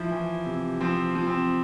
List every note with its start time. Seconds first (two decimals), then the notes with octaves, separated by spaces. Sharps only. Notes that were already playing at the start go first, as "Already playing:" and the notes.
Already playing: F3 E4
0.11 E3
0.45 C3
0.80 F3 C4
1.15 F3
1.27 C4